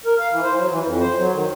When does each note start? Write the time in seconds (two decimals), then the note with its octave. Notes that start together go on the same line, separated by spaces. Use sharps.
0.06 A#4
0.19 F5
0.31 E3
0.43 C5
0.56 F#3
0.70 E3
0.83 F2
1.01 C5
1.16 F#3
1.33 D#3